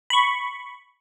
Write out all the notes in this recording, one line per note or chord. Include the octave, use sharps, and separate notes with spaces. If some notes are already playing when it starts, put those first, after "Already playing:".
B5 C#6